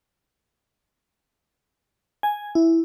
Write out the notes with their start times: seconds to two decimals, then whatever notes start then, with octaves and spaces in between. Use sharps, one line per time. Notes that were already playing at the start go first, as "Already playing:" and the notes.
2.23 G#5
2.55 E4